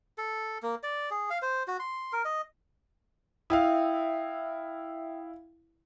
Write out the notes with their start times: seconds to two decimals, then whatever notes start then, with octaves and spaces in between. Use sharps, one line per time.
0.18 A4
0.63 A#3
0.83 D5
1.11 G#4
1.30 F5
1.42 C5
1.68 F#4
1.80 C6
2.13 A#4
2.25 D#5
3.50 E4 E5 F5 G5 D#6